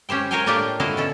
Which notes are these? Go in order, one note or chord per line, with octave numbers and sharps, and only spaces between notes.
C#4 G4 C5 G5
A#4 C5 C#5 F5 G5 G#5
A2 A#3 D4 F4 G4 G5
D3 E4 F#4 D#5 F5
B2 C#4 A4